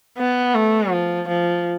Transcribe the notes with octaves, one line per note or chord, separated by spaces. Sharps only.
B3
A3
F3
F3